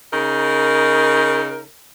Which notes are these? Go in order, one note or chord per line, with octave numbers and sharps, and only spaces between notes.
C#3 D#4 A#4